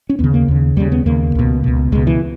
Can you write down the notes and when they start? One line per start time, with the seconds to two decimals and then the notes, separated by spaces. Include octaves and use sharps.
0.09 C#4
0.19 D#2 C#3 B3
0.34 A#3
0.48 D#2 C#3
0.76 D#2 C#3 G3
0.92 B3
1.06 D#2 C#3 A#3
1.35 C#2 B2
1.64 C#2 B2
1.92 C#2 B2 G#3
2.07 E3